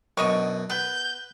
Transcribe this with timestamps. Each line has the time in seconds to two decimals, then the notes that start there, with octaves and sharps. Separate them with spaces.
0.17 F#2 B2 D3 D#5 C#6
0.70 B3 B4 G6